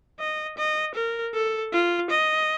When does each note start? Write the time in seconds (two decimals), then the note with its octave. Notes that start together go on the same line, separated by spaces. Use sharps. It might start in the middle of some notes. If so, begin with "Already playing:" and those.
0.20 D#5
0.58 D#5
0.95 A#4
1.34 A4
1.73 F4
2.10 D#5